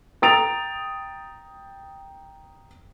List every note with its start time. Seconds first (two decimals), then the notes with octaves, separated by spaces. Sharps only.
0.22 G5 A#5 D#6 A6 D7 F7